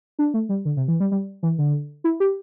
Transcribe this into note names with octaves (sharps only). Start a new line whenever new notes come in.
D4
A3
G3
D3
C3
E3
G3
G3
E3
D3
E4
G4